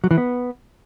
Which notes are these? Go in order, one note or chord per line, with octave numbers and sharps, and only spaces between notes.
F#3
E3
B3